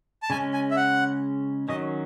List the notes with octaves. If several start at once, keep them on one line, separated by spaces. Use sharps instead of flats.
A5
C#3 G#3 C#4 G#5
G#5
E5
F#5
D#3 F#3 C#4 D#5